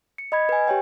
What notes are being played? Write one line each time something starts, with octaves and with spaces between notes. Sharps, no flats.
C#7
D#5 B5 G#6
B4 G#5
G4 C#5 G5